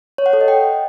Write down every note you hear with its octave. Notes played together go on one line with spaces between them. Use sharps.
C#5
F#5
A4
D#5
G5